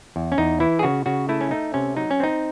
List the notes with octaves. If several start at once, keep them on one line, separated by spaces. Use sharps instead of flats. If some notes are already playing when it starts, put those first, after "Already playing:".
E2
C#4
E2 D#4
E3 E4
G#4
C#3 F#4
C#3 F#4
A3 E4
C#4
A3 D#4
C3 C#4
F#3 D#4
C#4
C4 D#4